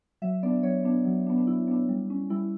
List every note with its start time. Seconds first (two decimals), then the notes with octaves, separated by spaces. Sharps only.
0.22 F#3 E5
0.43 B3 D4 D5
0.63 F#3 C#5
0.84 B3 D4
1.05 F#3
1.26 D4
1.30 B3
1.38 D4
1.47 F#3 E4
1.67 B3 D4
1.89 G3
2.10 C#4
2.30 G3 E4